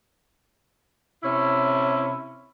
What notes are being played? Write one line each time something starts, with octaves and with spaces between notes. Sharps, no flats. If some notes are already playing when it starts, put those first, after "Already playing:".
C3 C#4 E4